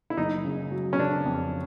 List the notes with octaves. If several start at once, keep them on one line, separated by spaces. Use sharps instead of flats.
E4
F#1 D#4
C#3
F#3
C#4
C#3 D4
F2